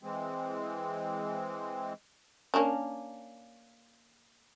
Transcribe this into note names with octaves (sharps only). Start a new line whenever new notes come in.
E3 G#3 C4
A#3 C#4 D4